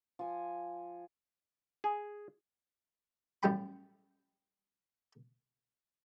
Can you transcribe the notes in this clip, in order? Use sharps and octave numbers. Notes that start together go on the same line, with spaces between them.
F3 G#5
G#4
A1 F#2 G3 C#4 G5 B5